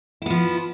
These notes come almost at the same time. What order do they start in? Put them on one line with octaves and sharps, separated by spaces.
E4 B3 F3